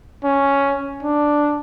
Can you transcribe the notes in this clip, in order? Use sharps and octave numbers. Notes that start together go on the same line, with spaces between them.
C#4
D4